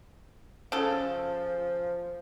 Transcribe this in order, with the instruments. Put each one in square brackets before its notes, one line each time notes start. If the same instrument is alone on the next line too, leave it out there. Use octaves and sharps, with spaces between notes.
[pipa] C#3 A4 [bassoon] F3